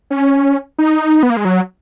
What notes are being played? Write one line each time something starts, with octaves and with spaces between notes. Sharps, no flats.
C#4
D#4
B3
A#3
G#3
F#3